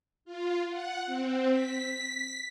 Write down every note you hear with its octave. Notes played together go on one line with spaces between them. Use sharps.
F4
F#5
C4
B6